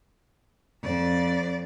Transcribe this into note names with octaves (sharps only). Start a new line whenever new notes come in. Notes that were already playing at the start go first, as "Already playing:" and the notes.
F2 D5